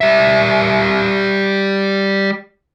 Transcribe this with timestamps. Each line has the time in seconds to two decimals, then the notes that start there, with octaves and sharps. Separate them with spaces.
0.01 G3 E5